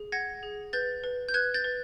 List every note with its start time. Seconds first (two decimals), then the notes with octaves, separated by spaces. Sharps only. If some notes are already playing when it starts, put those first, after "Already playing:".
Already playing: G#4
0.12 F#5 G#6 A#6
0.43 G#4
0.73 B4 G6 A6
1.04 B4
1.29 G6
1.34 B4 F#6 G#6
1.54 G6 A6
1.64 B4